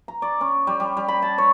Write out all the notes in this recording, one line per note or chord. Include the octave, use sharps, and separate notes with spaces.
A#5
D5
C#4
G3
G3
G3
B5
A5
C#5